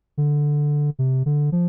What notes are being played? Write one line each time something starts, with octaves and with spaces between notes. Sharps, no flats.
D3
C3
D3
F3